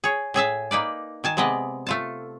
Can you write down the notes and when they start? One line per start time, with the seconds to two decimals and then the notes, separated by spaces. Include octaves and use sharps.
0.04 G#4 C#5
0.34 A2 G#4 E5 A5
0.71 A#3 D#4 B4 D5
1.24 D#3 G#5 A5
1.37 C3 G#3 B3 D5 D#5
1.87 A3 F4 A5